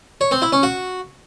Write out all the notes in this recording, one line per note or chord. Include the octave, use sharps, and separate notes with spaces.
C#5
C4
E4
C#4
F#4